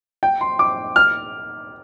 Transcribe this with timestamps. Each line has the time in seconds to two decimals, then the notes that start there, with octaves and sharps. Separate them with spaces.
0.23 G5
0.41 C6
0.59 D6
0.96 F6